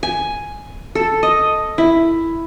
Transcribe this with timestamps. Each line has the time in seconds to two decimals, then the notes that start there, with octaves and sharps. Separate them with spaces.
0.03 G#5
0.95 A4
1.23 D#5
1.78 E4